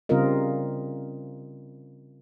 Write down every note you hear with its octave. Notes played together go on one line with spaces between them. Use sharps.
C#3 G3 C4 F4 A#4 D#5